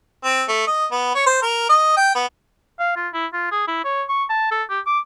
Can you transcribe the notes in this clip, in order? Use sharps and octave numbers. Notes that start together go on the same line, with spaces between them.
C4
A3
D#5
B3
C#5
C5
A#4
D#5
G5
B3
F5
F4
E4
F4
G#4
E4
C#5
C#6
A5
A4
G4
D6